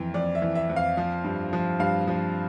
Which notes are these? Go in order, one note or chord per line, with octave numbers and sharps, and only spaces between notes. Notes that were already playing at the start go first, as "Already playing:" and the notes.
Already playing: F2 E3
F2 D5
E5
E3
E5
F2
F5
F3
G2
F3
G2 F5
F3